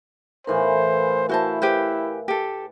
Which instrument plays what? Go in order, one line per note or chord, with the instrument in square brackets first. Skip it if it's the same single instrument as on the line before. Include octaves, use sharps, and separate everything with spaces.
[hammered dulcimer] A2 E3 B5 [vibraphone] A#4 F5 G#5 [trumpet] C5
[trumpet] E4 [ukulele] F#4 C5 A5
[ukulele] G4 B4 C5
G4 A4